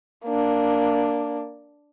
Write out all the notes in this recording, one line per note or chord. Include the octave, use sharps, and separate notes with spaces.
A#3 D4